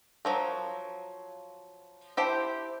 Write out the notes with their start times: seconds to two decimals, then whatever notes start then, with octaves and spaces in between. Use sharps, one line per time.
0.25 F3 F#3 A#4
2.17 E4 G4 C5 A5